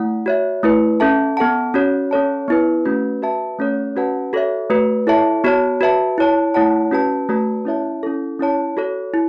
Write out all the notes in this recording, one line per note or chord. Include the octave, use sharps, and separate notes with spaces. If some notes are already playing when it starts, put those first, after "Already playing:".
Already playing: A3 E4 F#5
F#4 C#5 E5
A3 E4 B4
C#4 A4 E5 A5
B3 A4 F#5 A5
C#4 F#4 C#5
C#4 A4 C#5 A5
B3 E4 B4
A3 C#4 F#4 B4
F#4 B4 E5 A5
A3 C#4 A4 C#5
C#4 F#4 B4 F#5 A5
F#4 A4 C#5 E5
A3 F#4 B4
E4 A4 C#5 E5 A5
B3 F#4 C#5 A5
F#4 B4 E5 A5
E4 C#5 A5
A3 E4 C#5 F#5 A5
C#4 F#4 B4 A5
A3 F#4 B4 A5
C#4 E4 C#5 E5 A5
C#4 E4 A4
C#4 E4 C#5 A5
F#4 A4 C#5
E4